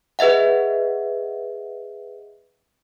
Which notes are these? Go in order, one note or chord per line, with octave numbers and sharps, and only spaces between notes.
G#4 B4 D#5 E5 F#5